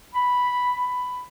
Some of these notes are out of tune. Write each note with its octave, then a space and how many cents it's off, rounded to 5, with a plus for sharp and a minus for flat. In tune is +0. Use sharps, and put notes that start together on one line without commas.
B5 +0
B5 +10